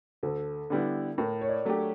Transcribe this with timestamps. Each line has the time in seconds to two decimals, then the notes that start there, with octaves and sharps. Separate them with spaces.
0.23 D2 A4
0.70 D3 G3 B3 E4
1.18 A2 A#4
1.41 C#5
1.49 D5
1.65 F#3 A3 D4 G4